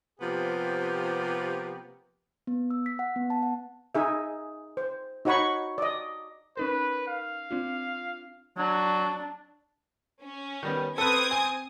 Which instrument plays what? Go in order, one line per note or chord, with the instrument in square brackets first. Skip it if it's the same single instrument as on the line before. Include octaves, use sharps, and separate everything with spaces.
[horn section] C3 F3 A#3 B3 G4
[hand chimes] B3
E6
B6
F#5
B3
A5
F#5
[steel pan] D#4 G#4 E5
C5
D#4 F#4 C#5 F#5 B5 C#6
D5 D#5
[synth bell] C#4 D#4 A#4 [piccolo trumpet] B4
[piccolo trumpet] F5
[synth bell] C4 D4 F4
[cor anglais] F#3 [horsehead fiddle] D4
[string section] C#4
[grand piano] D#3 G3 B3
[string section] C4 D#6 G#6 [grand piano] A4 B4
[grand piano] G#5